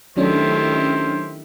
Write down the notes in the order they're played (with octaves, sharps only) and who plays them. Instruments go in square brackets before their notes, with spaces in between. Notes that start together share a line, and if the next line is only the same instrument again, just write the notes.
[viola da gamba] D#3 E4 G4 [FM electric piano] F#3 C#4 D4 [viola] A3 [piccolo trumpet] C5